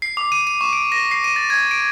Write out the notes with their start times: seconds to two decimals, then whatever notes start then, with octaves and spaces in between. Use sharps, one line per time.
0.02 C7
0.17 D6
0.32 D#7
0.47 D#7
0.61 C#6
0.73 D7
0.92 A#6
1.11 C7
1.24 D#7
1.36 A6
1.50 G#6
1.71 D7